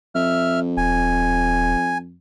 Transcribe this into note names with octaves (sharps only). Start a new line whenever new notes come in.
F2 E5 F6
D#1 G#5